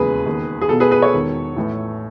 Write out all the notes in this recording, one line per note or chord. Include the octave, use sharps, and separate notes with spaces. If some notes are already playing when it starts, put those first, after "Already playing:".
Already playing: E1 D#2 C#3 E3 G#4 B4
E1 D#2 D#3
G#4
B1 B2 A4
G#4 B4
G#4 B4
A4 C#5
E1 E2 D#3
A1 A2 E3